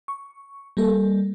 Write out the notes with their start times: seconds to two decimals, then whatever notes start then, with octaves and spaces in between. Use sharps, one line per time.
0.08 C#6
0.77 G3 A#3 A4